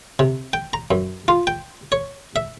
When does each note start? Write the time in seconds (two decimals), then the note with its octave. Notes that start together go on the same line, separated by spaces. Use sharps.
0.19 C3
0.53 G5
0.73 A#5
0.91 F#2
1.28 F4
1.47 G5
1.92 C#5
2.36 E5